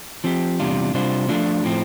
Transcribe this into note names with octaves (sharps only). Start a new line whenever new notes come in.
F3 C4 G4
E2 C3 G3 D4 F4
C3 G3 D4 F4 C5
F3 A3 D4 F4
A2 F3 C4